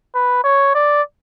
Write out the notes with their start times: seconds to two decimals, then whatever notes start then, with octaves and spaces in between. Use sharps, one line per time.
0.15 B4
0.44 C#5
0.75 D5